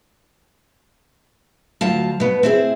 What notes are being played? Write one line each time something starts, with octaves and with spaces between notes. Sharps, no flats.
D2 F#3 F4 A5
B2 B3
C4 E4 G#4